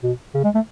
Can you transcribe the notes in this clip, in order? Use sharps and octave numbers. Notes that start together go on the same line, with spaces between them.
B2
C#3
G#3
A3